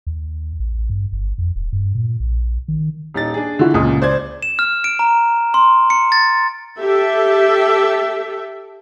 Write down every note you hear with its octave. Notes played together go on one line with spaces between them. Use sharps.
D#2
A1
G2
G1
F2
D#1
G2
A#2
A#1
D#3
D#1 D#4 A6
D4 G#4
D3 E4 F#4
C#2 A#2 C#3 D#6
C5 D5 G#6
E7
F6
D7
A#5
C6
C#7
A6
G4 A4 E5